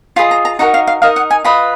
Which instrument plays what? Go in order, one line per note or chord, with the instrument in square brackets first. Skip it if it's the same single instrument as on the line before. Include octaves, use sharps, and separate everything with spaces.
[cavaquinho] F4 G#4 D#5 B5
A#5
A#5
D#4 F#4 A#4 F#5
F5
F5
D#4 A#4 D#5 F5
F#5
G#5
F4 B4 D#5 B5